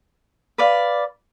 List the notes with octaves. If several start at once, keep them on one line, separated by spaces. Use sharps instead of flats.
B4 D5 F5